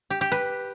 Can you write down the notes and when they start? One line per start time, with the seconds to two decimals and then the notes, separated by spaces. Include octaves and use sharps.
0.10 G4
0.21 G4
0.32 B4